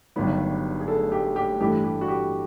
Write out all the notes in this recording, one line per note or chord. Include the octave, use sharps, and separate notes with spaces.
G1 G2 D#3 F#3 B3
G#4
A4
G4
G4
G2 E3 A3 G4
G4
F#4
G4